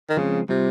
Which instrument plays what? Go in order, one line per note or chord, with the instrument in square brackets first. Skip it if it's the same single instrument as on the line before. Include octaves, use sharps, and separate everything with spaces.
[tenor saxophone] D#3
[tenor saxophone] C#3 [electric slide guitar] F3 G#3 C4
[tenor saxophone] C3 [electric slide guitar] G3 C4 F4